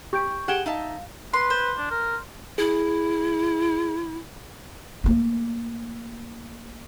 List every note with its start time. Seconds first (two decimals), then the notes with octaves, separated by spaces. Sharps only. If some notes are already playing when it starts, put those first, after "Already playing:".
0.13 G4 C#6 G6 D7
0.48 G4 G#4 F#5 G5 E7 G7
0.66 D#4 E5 F5 A5
1.34 B4 C6
1.50 C5
1.78 D4
1.91 A#4
2.58 E4 G#4
5.04 A3 A#3